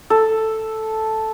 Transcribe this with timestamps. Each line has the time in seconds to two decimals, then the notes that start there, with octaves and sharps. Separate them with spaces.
0.10 A4